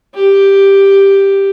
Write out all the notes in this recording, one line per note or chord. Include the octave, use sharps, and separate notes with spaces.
G4